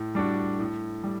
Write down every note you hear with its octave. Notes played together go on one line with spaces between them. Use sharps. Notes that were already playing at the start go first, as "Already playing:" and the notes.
Already playing: A2
G3 D4 F#4
A2
G3